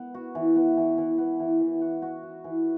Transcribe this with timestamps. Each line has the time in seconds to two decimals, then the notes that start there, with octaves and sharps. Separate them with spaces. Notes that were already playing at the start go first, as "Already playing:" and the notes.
Already playing: B3
0.14 F#4
0.35 E3
0.56 B3
0.77 E3
0.98 E3
1.18 B3
1.40 E3
1.61 E3
1.81 F#4
2.02 F#4
2.23 F#4
2.44 E3